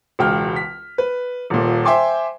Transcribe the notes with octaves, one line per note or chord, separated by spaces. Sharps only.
E1 C#2 G5 F6
B6
B4
D#1 A#2
C5 E5 G5 G#5 C6 D6